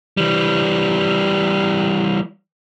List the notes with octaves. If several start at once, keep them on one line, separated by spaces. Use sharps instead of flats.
E3 G3